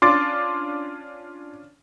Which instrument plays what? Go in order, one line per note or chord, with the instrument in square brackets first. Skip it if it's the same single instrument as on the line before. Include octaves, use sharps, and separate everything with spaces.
[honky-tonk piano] C#4 D4 F4 [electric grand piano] C6 D6 A6